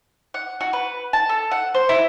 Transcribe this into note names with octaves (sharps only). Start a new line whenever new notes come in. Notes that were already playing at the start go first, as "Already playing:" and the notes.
F#5
F#4
B4
A5
A4
F#5
C5
E4